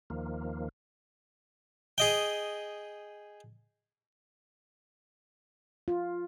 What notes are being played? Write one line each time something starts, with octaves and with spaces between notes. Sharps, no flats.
D#2 D#3 F3 A#3
G#4 D#5 G5
F4